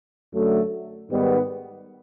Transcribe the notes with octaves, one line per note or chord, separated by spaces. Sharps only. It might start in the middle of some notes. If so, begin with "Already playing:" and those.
F#2 D3 F#3 A3
G#2 D#3 G3 B3